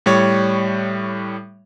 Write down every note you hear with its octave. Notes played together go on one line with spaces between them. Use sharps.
A2 G3 C#5